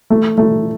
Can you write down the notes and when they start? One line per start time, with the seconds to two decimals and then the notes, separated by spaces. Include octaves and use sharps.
0.10 A3
0.38 A3